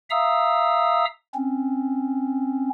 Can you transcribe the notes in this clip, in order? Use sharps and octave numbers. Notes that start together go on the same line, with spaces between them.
E5 F5 A#5 D#6 E6
C4 C#4